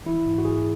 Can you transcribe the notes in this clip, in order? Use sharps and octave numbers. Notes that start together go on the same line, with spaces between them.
E3 E4
G#2
F#4
G#2 G#4